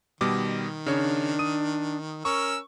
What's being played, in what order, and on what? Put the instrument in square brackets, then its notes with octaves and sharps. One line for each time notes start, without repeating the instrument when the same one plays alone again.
[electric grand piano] B2 G3 D6 [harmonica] D#3
[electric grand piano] C#3 C#5 [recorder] D4
[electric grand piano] D#6 D#7
[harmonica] C#4 A#4 E6 [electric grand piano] C#6